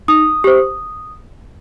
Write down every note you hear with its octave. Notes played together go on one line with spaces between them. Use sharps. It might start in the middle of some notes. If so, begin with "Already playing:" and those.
D#4 D#6
G4 C5